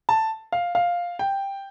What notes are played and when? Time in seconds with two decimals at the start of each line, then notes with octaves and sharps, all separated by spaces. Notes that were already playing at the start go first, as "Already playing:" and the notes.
0.09 A5
0.52 F5
0.75 F5
1.19 G5